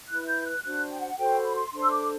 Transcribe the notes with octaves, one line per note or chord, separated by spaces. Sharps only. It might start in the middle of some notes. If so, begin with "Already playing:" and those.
E4 B4 F#6
G6
F#6
D4 F#4 C5 F#6
G5
F#5
F#4 A4 C5 G5
C6
B5
C6
D4 A4 C5 C6
E6
D6